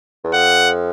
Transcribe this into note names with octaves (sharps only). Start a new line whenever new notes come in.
E2
F2 F#5